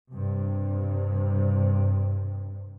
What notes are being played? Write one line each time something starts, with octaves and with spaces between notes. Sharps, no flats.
G2 C3